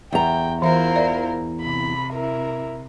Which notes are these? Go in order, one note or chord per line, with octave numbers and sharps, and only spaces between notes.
E2 G5 A#5
E3 E4 F4 A#4 C5 E5
D5 E5
C3 B5
E4 A#4